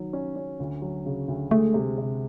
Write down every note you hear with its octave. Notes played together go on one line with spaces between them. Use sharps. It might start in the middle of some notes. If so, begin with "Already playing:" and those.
Already playing: D#3 F#3
C#4
C#4
D2
F#3
C#3
D2
G#3 A3
C3
C3